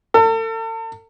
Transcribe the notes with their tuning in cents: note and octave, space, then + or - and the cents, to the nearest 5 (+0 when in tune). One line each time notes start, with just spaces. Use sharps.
A4 +40